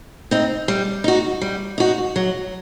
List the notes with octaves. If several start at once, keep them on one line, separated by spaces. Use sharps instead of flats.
C4 D#4
G3
D#4 F#4
G3
D#4 F#4
F#3